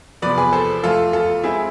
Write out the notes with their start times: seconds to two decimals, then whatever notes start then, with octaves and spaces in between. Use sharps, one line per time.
0.22 E2 C3 F3 B3 B4 D5
0.38 G#4 B4
0.53 A4 C5
0.83 F2 E3 A3 F4 A4
1.13 F4 A4
1.43 G#3 C4 E4 G#4